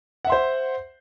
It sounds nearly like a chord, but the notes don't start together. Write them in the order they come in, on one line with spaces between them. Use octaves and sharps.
F#5 E5 C6 C5